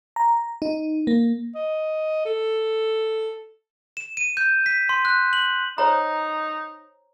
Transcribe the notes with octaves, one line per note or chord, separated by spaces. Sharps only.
A#5
D#4
A#3
D#5
A4
E7
D#7
G6
B6
C6
F#6
F#7
D#4 C5 C#5 A#5